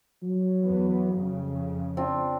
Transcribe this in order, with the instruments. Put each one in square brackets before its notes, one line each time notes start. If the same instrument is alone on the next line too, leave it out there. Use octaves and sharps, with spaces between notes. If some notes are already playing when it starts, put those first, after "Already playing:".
[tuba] F#3
[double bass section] E2 B3
F2 C#3
[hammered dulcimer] C4 D4 F4